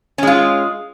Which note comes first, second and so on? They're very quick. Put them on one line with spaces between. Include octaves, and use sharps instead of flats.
C#4 G#3 F4